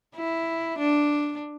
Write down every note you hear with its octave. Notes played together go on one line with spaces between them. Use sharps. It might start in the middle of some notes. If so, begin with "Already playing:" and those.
E4
D4